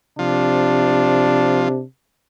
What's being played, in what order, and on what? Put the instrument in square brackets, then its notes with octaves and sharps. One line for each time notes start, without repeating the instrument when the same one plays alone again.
[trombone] C3 [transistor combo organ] F3 [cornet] D4